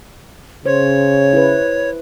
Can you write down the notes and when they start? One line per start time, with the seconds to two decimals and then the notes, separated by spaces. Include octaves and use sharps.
0.66 C#3 C5 C#5
1.33 E4 B4